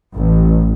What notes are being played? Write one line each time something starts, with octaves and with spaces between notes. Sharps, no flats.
A1